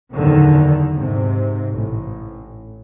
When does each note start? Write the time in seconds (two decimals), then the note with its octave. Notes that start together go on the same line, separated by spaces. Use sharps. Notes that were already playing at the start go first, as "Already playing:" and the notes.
0.15 F#1 E2 A2 D3 D#3
0.98 G#2 C3
1.76 A1